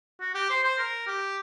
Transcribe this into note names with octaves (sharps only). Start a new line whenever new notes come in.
F#4
G4
C5
C5
A#4
G4